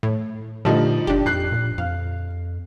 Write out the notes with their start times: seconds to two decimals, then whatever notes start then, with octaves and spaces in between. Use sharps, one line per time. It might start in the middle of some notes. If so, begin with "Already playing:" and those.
0.03 A2
0.65 A#2 D3 F3 G3 A3 D4 D#4
1.07 F#1 D4 G4
1.26 F2 F#6 C7
1.52 A#2
1.78 F2 F5